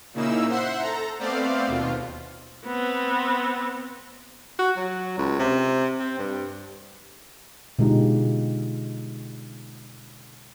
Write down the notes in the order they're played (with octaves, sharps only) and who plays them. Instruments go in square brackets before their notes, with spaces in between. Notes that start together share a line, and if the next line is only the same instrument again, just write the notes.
[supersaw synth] A#2 C#3 A#3 D#4 E4 E6
C5 E5 F#5 C6
A4 A#5
A3 B3 C4 C5 D5 F5
D#2 B2 F4
[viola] B3 C4
[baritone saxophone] F#4
F#3
C#2
C3
C4
G2
[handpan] B2 D3 G#3 D#4 F4 G4